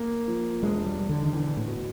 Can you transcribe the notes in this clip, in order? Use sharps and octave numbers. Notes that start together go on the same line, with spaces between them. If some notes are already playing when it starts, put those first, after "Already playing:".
Already playing: A#3
F3
E1 G#3
G3
E1
D3
D#3
E2 D3
A2
B2